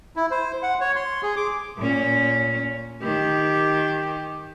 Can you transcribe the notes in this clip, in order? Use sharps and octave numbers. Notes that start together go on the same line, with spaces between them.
E4
C5
F#5
C#5
C6
G#4
D6
A#2 C#4
D#3 G4